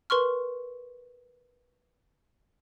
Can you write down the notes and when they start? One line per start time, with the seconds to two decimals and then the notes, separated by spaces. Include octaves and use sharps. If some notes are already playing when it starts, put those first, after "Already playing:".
0.10 A#4 B4 C6 C#6 F6